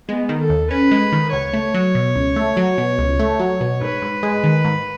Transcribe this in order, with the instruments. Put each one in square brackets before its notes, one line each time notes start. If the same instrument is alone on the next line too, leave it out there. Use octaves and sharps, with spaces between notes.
[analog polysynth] G#3 [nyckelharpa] B3
[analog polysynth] D#3
[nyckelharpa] A4
[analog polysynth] D#2
[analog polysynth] C#4 [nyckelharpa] B4
[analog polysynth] G#3
D#3
[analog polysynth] C#2 [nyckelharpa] C#5
[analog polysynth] A3
F#3
B2
C#2
A3
F#3
B2
C#2
A3
F#3
B2
[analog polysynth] G#2 [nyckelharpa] B4
[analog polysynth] G#2
G#3
D#3
G#2